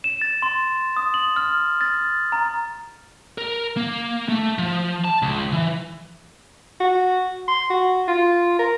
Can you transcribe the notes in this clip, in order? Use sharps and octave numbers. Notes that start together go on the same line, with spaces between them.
E7
A6
C6
D#6
F#7
F6
A6
A#5
A#4
A#3
A3
F3
A5
C#2
E3
F#4
C6
F#4
F4
A#4